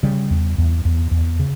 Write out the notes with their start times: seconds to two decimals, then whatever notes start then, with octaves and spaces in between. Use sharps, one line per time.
0.03 C#3 G3
0.30 E2
0.58 E2
0.85 E2
1.11 E2
1.39 C#3